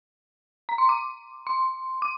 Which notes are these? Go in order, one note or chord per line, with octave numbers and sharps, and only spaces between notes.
A#5
C6
D6
C6
D6